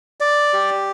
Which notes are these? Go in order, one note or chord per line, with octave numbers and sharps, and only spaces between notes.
D5
G4